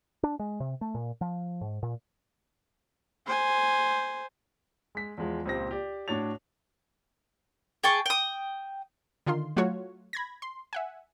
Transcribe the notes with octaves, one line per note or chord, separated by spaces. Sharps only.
D4
G#3
C3
A3
A#2
F3
G#2
A#2
C5 G#5
G#3 B6
E2 F3 G#3
C#2 A#2 C4 G4 A#6
G4 D5
A2 D4 F#4 C#5 A6 F7
G#4 G5 A5 C#6
G5 D#6
D3 D#3 F4 C6
F#3 A3 F4 F#4 C#5
B5 G#6 A#6
C6
E5 F#5 G#5